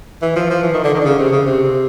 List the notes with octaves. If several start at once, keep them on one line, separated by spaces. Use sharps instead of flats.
E3
F3
F3
E3
D#3
D3
D#3
D3
C#3
C3
C#3
C3